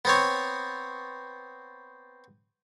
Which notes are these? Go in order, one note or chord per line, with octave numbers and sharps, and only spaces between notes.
B3 C4 C#5